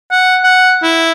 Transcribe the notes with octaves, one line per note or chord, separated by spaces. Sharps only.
F#5
F#5
E4